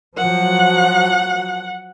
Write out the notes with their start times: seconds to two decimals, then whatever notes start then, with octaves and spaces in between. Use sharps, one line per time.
0.18 F3 F#3 F#5